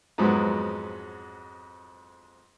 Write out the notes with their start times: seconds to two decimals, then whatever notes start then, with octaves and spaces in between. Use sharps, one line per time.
0.18 F2 G#2 F#3 G#3 B3